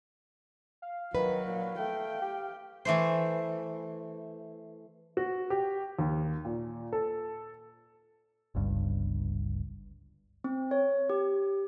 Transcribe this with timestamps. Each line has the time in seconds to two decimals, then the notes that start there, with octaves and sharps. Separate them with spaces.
0.82 F5
1.15 D#3 F#3 B4
1.47 A#2
1.79 A3 G5
2.22 G4
2.85 E3 A3 C5
5.17 F#4
5.50 G4
5.99 D#2
6.45 A#2
6.93 A4
8.55 G1 C#2 G2
10.44 C4
10.71 C#5
11.10 G4